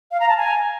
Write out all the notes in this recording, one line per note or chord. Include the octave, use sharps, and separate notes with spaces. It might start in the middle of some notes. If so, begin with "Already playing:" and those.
F5
A#5
A5
G#5